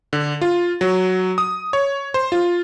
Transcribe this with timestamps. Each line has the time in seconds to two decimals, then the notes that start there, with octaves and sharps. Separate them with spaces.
0.13 D3
0.42 F4
0.81 F#3
1.38 D#6
1.73 C#5
2.14 C5
2.32 F4